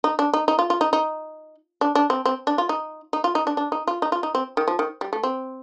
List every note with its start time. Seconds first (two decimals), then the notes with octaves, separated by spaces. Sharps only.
0.04 D#4
0.19 D4
0.33 D#4
0.48 D#4
0.59 F4
0.70 F4
0.81 D#4
0.93 D#4
1.81 D4
1.95 D4
2.10 C4
2.25 C4
2.47 D4
2.58 F4
2.69 D#4
3.13 D#4
3.24 F4
3.35 D#4
3.47 D4
3.57 D4
3.72 D#4
3.87 F4
4.02 D#4
4.12 F4
4.23 D#4
4.35 C4
4.57 D#3
4.68 F3
4.79 D#3
5.01 G3
5.13 A3
5.23 C4